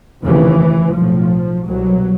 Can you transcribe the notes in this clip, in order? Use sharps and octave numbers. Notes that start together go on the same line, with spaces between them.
F1 D#2 C#3 E3
B1 A2 F3
C2 B2 F#3